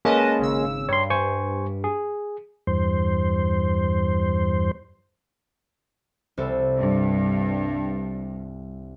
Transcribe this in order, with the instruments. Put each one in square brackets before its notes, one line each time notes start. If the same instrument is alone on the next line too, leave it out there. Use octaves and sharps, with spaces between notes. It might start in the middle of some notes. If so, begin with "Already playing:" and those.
[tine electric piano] G#3 A#3 C#4 [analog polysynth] B4 D#5 A5
[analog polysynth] G#1 C#3 E6
[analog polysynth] G2 [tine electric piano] C#5 C6
[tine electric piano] C5 G#5 C#6
G#4
[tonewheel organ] E2 G2 C5
[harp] C2 C4 A4
[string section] G2